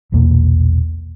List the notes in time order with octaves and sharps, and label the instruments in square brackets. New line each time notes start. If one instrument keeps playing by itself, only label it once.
[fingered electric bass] A#1 E2 B2 A#3